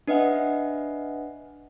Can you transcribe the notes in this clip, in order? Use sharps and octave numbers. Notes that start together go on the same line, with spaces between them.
D4 B4 D#5 E5 F#5